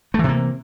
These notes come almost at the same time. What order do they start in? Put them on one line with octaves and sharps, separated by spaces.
A3 E3 C3 A#3